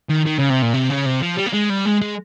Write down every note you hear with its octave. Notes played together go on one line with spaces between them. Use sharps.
D#3
D#3
C#3
C3
A#2
C3
C#3
C3
F3
G3
A#3
G#3
G3
G#3
G#3